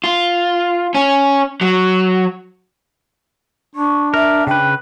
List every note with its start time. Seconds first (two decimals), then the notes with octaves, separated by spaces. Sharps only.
0.04 F4
0.94 C#4
1.61 F#3
3.75 D4 C#6
4.14 A#4 E5
4.47 C#3 B4 G5